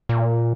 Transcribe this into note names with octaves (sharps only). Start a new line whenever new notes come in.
A#2